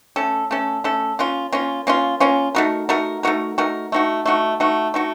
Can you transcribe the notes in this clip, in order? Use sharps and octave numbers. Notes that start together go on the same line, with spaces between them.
A3 C#4 A4
A3 C#4 A4
A3 C#4 A4
A#3 C#4 F4
A#3 C#4 F4
A#3 C#4 F4
A#3 C#4 F4
A3 D#4 F#4 A#4
A3 D#4 F#4 A#4
A3 D#4 F#4 A#4
A3 D#4 F#4 A#4
A3 D#4 F#4
A3 D#4 F#4
A3 D#4 F#4
A3 D#4 F#4